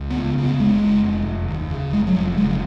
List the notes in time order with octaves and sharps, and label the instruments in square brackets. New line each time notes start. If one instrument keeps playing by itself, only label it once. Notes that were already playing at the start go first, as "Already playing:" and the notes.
Already playing: [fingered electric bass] C#2
B3
C#3
C#3
B3
F1 G#3
F1
F1
F1
D#2
C#3
F1 G#3
F#3
F1 F3
C#3 G#3